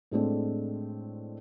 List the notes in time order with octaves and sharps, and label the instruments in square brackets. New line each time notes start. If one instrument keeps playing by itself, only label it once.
[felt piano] A2 G#3 A3 C4 D4